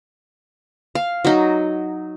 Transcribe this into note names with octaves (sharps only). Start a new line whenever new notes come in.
F5
F#3 D#4